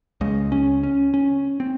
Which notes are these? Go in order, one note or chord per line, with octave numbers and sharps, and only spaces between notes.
C#2 C#3 G#3
C#4
C#4
C#4
C4